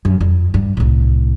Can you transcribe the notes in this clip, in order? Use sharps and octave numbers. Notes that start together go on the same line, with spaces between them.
F#2
F2
G2
C2 A2